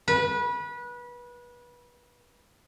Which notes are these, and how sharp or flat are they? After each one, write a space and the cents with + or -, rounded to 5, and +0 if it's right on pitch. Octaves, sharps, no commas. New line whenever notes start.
B4 -25